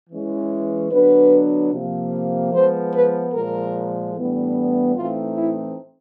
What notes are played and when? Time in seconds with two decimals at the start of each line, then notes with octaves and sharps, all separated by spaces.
0.10 E3 G#3 C#4
0.91 D3 F#3 B3 D4 B4
1.72 C3 F3 A#3
2.53 F3 G#3 B3 C5
2.93 B4
3.33 A#2 F3 G#3 A#4
4.14 A2 E3 G3 B3 D4
4.96 A2 E3 A3 C4 D#4 F4
5.35 E4